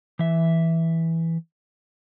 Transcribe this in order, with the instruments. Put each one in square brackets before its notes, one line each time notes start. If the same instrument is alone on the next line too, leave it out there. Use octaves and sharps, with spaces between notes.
[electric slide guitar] E3 E5